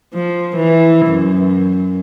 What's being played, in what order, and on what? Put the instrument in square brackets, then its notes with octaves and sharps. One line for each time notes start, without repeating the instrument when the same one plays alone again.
[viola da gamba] F3
E3
F#2